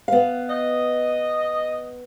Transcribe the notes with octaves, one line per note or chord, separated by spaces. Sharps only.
B3 F5
D#5